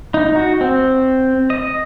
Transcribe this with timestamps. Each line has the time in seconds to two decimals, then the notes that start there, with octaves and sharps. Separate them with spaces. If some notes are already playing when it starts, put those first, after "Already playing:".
0.14 D#4
0.36 F#4
0.61 C4
1.50 D#5